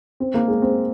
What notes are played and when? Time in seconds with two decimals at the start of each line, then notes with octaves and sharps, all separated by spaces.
0.20 C4
0.34 A#3
0.48 G#3
0.62 C4